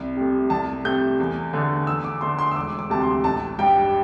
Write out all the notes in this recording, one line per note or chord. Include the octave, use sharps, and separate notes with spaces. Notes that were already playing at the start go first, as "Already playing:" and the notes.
Already playing: C2
C3 A3
C2 A5
C3 A3 G6
E2
D3 A3
E2 E6
D6
D3 A3 C6
C6
E6
E1 D6
D6
D2 C3 A3 A5
C6
A1 A5
G2 G3 G5